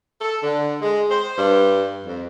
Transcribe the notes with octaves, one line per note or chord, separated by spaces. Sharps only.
A4
D3
G#3
C5
G2
F2